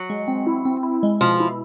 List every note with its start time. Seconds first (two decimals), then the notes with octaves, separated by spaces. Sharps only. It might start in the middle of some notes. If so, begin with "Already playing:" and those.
Already playing: F#3
0.10 G#3
0.28 C4
0.47 E4
0.65 C4
0.83 E4
1.03 G#3
1.21 B2 F3
1.40 E4